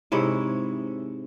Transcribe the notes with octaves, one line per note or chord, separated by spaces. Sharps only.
G#2 C3 E4 C#5